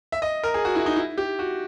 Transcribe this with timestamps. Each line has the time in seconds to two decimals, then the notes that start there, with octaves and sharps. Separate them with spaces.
0.12 E5
0.22 D#5
0.44 A#4
0.54 G#4
0.65 F#4
0.75 E4
0.86 D#4
0.96 E4
1.18 G4
1.39 F#4